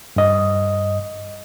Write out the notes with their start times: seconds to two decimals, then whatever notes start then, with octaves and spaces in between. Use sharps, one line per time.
0.16 G2 D#5